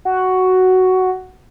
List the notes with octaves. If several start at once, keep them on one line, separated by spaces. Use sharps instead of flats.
F#4